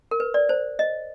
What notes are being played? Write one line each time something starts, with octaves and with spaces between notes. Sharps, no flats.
A#4
B4
D5
C5
D#5